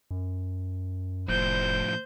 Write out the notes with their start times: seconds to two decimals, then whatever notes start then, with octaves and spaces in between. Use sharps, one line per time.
0.11 F#2
1.29 F1 A2 F3 C5 G6